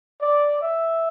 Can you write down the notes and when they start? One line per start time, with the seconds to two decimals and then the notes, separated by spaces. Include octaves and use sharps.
0.20 D5
0.62 E5